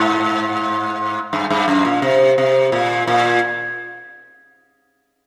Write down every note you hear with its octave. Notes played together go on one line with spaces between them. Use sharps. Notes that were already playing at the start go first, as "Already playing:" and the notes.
Already playing: G#2
G2
G2
F#2
A#2
C3
C3
A#2
A#2